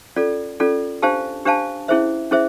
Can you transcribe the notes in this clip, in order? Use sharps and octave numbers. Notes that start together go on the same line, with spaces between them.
C#4 F4 A4 D5
C#4 F4 A4 D5
D4 G4 C5 F5 A5
D4 G4 C5 F5 A5
C#4 E4 G#4 C5 E5
C#4 E4 G#4 C5 E5